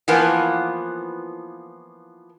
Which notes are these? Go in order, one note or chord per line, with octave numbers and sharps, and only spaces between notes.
E3 F3 A#3 B3